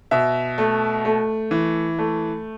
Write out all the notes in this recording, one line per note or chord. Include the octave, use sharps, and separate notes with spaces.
B2 E5
A3
A3
E3
A3